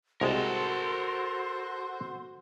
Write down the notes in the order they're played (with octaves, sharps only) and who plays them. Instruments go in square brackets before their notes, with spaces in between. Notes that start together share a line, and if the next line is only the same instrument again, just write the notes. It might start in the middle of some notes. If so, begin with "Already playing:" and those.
[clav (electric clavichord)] C2 G#3 [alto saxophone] F#4 [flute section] A4 C5 C6 [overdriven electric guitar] A#4 A5